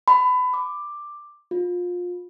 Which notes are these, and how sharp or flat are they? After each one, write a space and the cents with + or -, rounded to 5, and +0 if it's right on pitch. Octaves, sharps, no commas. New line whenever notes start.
B5 +25
D6 +10
F4 +25